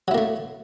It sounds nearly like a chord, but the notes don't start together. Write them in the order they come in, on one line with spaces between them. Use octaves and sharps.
F#3 E4 A#3 A3